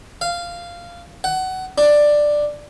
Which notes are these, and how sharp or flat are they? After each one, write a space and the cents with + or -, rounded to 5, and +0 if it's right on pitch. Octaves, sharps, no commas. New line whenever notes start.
F5 -10
F#5 +20
D4 +10